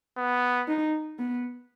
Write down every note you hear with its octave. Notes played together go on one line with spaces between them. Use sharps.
B3
D#4
B3